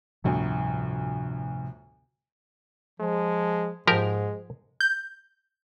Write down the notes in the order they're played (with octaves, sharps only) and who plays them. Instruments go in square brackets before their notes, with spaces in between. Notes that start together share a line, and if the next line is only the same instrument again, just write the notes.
[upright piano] G1 D2 [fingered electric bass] A2 C3 F3
[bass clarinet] F3 [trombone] G#3
[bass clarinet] G#2 [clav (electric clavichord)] F3 G4 A#4 [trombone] G#3
[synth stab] G6